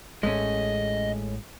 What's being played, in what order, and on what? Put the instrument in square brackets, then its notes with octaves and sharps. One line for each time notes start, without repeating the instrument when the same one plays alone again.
[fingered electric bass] A1 A2 [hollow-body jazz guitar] G#3 A3 C#4 [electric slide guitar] D#5